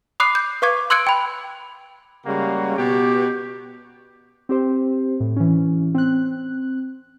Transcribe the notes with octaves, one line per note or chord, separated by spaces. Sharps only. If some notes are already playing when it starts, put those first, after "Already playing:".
B5 D6 D#6 F#6 C7
G6
B4 F5 C#6 D6 G#6
C6 E6 F#6 G#6 C#7 D7
G5 B5
C#3 G3 G#3 A#3 F#4
B2 B3 G4
C4 G4 C5
A2
E3 C#4
C4 F#6